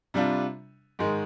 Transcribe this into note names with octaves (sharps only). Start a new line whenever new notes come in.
C3 G3 D4 F4
G#2 D#3 G#3